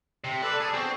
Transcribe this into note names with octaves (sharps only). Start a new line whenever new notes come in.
C3
A4 B4 D5 A5
G#4
D3 B3 C4 F#4